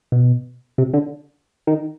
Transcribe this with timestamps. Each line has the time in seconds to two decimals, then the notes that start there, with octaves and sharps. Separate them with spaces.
0.12 B2
0.78 C3
0.93 D3
1.67 D#3